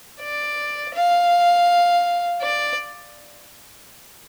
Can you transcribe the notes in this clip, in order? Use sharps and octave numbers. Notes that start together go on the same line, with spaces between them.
D5
F5
D5